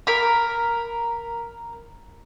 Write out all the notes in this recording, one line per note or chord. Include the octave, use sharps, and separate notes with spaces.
A#4 B5